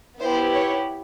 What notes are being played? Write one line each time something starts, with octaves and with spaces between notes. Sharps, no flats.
B3 E4 G4 C5
C#5